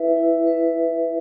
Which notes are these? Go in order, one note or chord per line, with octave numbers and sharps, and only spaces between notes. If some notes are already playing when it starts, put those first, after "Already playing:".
Already playing: E4 B4 E5
E4
B4 E5
E4